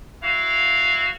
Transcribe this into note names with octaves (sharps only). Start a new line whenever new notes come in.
E4 F#4 F5